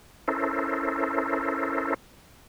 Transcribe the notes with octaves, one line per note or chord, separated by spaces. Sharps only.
C#4 E4 A4 A#4 C5